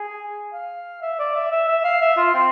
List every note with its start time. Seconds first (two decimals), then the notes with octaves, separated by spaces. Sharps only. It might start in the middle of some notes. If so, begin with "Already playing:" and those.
Already playing: G#4
0.53 F5
1.02 E5
1.19 D5
1.35 E5
1.52 E5
1.68 E5
1.84 F5
2.02 E5
2.17 F4
2.34 C4